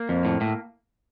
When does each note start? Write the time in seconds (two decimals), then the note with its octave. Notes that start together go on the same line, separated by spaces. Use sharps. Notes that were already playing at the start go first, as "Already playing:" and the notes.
Already playing: A#3
0.09 F2
0.25 A2
0.41 A2